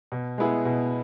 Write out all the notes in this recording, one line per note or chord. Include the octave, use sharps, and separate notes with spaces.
B2
G#3 B3 E4 G#4
B2